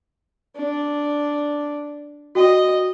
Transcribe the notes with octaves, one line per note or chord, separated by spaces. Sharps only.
D4
F#4 D#5 G5